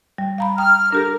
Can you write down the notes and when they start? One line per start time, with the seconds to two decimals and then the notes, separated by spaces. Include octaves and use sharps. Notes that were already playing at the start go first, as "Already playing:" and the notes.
0.18 G3
0.38 F5 A#5 B5
0.58 G5 A#5 D#6 F6
0.93 D4 G4 A4 A#4